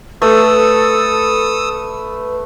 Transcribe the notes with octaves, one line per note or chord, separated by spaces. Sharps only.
A3 A4 B4 D#6 E6